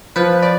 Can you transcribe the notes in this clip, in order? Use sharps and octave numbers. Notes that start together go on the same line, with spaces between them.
F3 B4
D5